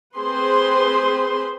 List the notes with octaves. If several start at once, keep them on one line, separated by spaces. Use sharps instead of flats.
C4 G#4 B4 C5 C6